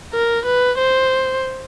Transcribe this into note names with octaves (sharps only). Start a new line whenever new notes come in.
A#4
B4
C5